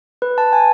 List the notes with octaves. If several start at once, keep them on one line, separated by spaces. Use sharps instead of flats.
B4
A5
G#5